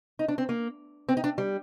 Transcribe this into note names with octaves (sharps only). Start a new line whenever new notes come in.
D#4
D4
C4
A#3
C4
D#4
D4
G3